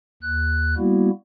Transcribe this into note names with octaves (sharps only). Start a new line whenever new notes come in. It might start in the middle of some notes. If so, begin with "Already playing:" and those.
D#2 F#6
G3 A#3 B3 E4 F#4